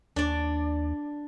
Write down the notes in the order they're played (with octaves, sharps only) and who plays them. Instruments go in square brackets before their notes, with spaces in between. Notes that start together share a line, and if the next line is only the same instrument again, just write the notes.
[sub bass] D#2 [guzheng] D4 D5